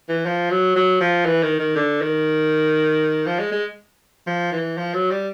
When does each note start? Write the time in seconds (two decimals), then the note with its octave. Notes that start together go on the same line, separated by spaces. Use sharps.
0.09 E3
0.26 F3
0.51 F#3
0.76 F#3
1.01 F3
1.26 E3
1.43 D#3
1.59 D#3
1.76 D3
2.01 D#3
3.27 F3
3.39 G#3
3.52 G#3
4.27 F3
4.52 E3
4.77 F3
4.94 F#3
5.11 G3